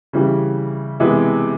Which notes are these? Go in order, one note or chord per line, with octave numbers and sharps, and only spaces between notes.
C#3 E3 G3
C3 E3 G#3 B3